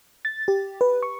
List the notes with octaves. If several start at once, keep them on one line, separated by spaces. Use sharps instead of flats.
A6
G4
B4
C#6